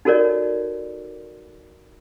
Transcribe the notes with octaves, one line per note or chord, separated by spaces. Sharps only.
D#4 F#4 A4 A#4 C#5 D5